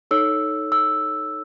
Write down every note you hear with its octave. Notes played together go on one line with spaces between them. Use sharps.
D#4 A4 C#5 E6
E6